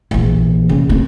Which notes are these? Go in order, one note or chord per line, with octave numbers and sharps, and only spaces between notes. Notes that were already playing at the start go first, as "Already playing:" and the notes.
A#1 E3
C#3
A#3 C4